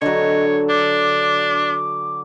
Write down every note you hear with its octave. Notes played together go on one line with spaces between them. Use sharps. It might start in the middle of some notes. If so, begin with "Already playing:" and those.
D3 F#3 C#5 D#5
D4 D6